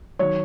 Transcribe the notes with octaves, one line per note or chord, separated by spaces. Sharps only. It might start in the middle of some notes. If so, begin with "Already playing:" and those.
D#3 F#3 C#5